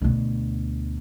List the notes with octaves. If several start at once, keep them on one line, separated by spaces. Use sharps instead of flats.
D2 B2